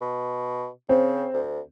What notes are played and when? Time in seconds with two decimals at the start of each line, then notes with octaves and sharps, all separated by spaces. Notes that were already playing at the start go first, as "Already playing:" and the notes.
0.01 B2
0.89 C#3 C4
1.34 D2